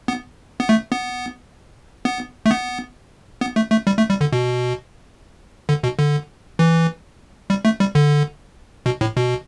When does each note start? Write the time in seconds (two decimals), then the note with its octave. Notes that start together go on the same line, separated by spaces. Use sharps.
0.08 B3
0.60 B3
0.69 A3
0.92 B3
2.05 B3
2.46 A3
2.51 B3
3.41 B3
3.56 A3
3.71 A3
3.87 G3
3.98 A3
4.10 G3
4.21 D3
4.33 B2
5.69 D3
5.83 B2
5.99 D3
6.59 E3
7.50 G3
7.65 A3
7.80 G3
7.95 D3
8.86 B2
9.01 A2
9.17 B2